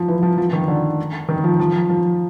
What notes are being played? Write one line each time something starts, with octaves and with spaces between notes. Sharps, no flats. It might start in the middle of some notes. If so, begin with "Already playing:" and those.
Already playing: F3
E3
F3
F3
D#3
D3
D#3
F3
F3
F3